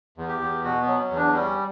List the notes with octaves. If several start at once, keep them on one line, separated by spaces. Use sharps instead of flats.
E2
G4
E2
B2 F#4
B3
F#3
C#4
E2
D4
G3 C#4